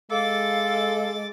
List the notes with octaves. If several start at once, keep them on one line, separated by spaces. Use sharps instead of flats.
G#3 A4 F5 D6 A6